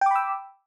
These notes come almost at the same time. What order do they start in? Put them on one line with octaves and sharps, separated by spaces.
G5 D6 B5 E6